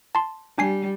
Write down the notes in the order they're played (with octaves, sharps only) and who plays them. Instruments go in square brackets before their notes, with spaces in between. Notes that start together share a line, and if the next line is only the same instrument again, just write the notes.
[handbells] A5 C6
[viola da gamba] G3 [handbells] D4 G#5 C7